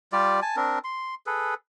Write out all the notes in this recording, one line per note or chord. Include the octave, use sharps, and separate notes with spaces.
G3 F4 G4 D5
G#5 A5
C4 D4 A#4
C6
G#4 A4 B4